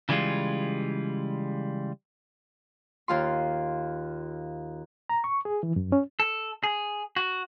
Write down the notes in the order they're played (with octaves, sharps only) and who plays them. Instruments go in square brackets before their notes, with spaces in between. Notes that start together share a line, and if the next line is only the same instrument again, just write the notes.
[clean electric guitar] C#3 E3 G3 G#3 F4
[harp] D#2 F4 C6
[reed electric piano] A#5
C#6
G#4
E3
F#2
C#4
[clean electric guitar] A4
G#4
F#4